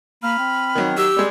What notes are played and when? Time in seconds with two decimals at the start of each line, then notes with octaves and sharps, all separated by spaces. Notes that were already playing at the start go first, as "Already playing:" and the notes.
0.23 A#3 B5 F6
0.39 C4
0.75 D#3 F#3
0.97 G4 E6
1.17 G3 G#3